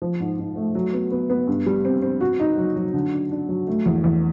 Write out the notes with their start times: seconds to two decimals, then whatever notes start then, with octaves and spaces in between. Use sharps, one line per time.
0.02 F3
0.20 G#2
0.39 G#2
0.56 A3
0.75 F#3
0.93 B3
1.11 B3
1.30 B3
1.47 G2
1.66 G3
1.85 C4
2.02 C4
2.21 F#4
2.40 D#4
2.58 F#3
2.76 F#3
2.94 D3
3.13 D4
3.31 D4
3.49 F#3
3.67 A3
3.86 E2
4.04 E2